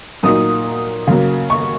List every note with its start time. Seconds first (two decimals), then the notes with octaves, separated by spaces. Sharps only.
0.23 A#2 F#3 A#3 D#4 D#6
1.07 C#3 F#3 A#3
1.50 C#6